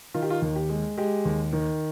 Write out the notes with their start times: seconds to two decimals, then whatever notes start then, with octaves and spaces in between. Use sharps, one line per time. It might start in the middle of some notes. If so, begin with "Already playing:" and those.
0.14 D#3 F4
0.22 G4
0.30 F4
0.42 D#2
0.56 G4
0.69 G#3
0.98 G#3 G4
1.25 D#2
1.53 D#3